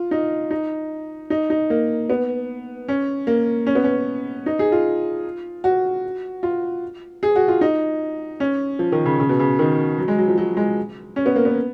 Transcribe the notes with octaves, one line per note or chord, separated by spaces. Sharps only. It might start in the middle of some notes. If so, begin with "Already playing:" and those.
Already playing: F4
D#4
D#4
D#4
D#4
A#3
B3
C#4
A#3
C#4
B3
C#4
D#4
G#4
F4
F#4
F4
G#4
F#4
F4
D#4
C#4
F3
D#3
C#3
C#3
B2
C#3
D#3
F#3
G#3
F#3
F3
F#3
G#3
C#4
B3
A#3
B3